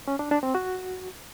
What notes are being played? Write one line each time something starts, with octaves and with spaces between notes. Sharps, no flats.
C#4
D4
D4
C4
F#4